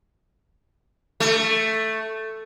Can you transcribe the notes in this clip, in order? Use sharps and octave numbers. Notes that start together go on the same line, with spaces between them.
A3